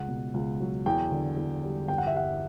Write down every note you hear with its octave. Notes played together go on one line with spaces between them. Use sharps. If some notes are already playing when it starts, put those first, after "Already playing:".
Already playing: C#2 F#5
B2
C#2
F#3
E2 G5
D3
E2
G3
G1 G5
F#5
E5
G2 F#5